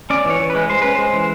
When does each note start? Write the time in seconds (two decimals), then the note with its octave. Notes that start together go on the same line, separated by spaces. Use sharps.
0.10 C#4 D5
0.25 E3 C#5
0.40 E3
0.50 B4
0.55 G#3
0.69 G#3 C5
0.82 C#4 B4
0.95 G#3 C5
1.13 E3